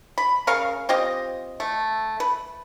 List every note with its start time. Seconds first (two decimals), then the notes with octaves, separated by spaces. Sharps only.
0.18 B5
0.47 C#3 A#4 F5 C#6
0.89 C4 F4 G4 D#5
1.60 A3
2.20 B4